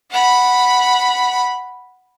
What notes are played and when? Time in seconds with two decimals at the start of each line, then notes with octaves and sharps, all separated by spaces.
0.11 F#5 B5